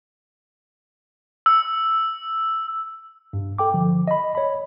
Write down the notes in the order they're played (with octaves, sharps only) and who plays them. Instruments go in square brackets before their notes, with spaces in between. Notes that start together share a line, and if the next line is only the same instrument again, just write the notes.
[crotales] E6
[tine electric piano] G2
A4 G5 D6
D3 F3
D#5 B5
C#5 B5